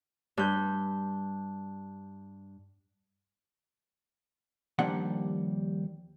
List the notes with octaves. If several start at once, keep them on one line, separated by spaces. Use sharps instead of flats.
G2 G6
D#2 F3 G3 A#3 D4 F#5